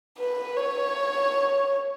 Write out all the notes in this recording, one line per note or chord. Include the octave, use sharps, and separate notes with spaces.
B4
C#5